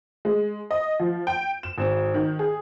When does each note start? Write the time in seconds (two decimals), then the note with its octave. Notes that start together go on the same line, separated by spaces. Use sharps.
0.25 G#3
0.71 D#5
1.00 F3
1.27 G5
1.63 E7
1.78 G#1
2.14 D#3
2.39 G#4